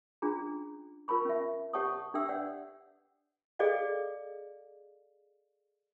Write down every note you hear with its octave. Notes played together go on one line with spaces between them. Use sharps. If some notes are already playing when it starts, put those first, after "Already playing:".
C#4 D4 F4 G#4 A#5
F4 A#4 A5 B5 C#6
C#4 E5
G4 C#5 F#5 A5 C#6 D#6
D4 G4 A4 E5 G5 E6
B4 C#5 D5 F#5
G#4 A4 D5 D#5 F5